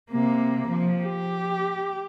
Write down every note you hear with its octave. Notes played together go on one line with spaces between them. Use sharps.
C3 A#3
F3
G4